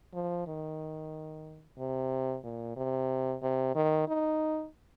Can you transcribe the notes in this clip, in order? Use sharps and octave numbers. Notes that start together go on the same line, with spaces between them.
F3
D#3
C3
A#2
C3
C3
D#3
D#4